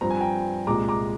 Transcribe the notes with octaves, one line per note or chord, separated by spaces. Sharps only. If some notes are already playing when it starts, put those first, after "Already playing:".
G2 F3 C4 A#5
G#5
G5 A#5
C2 A#2 G#3 A#5 D6
A#5 D6